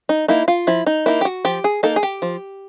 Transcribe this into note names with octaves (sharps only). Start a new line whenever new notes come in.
D#4
A#3 D#4 E4
F4
F3 E4
D#4
A#3 D#4 E4
G4
F#4
F3 G4
G#4
A#3 D#4 A4
G#4
G4
F3